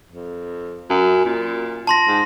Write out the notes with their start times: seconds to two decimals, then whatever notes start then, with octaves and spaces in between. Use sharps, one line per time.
0.11 F2
0.90 F#2
1.25 A#2
1.87 A5 C6 A#6
2.08 G#2